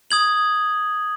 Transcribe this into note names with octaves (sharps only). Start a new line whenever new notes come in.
D#6 G#6 F#7